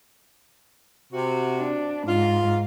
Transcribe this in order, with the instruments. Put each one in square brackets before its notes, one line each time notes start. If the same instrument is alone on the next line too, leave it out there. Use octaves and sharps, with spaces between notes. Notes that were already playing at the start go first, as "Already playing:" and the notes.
[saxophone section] C3 F#4
[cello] D4
[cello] G#2 [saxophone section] F4